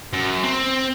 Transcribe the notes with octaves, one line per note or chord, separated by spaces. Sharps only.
F#2
C4